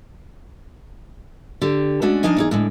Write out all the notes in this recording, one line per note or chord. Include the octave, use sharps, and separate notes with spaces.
D3 G4
G#3 A3 C#4 D4 F#4
F3 A#3 D4 D#4 D#5 G#5
E2 D#4 G#4
A2 D3 G#3